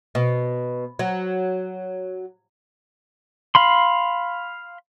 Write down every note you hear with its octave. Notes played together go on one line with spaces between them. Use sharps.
B2
F#3
F5 B5 C6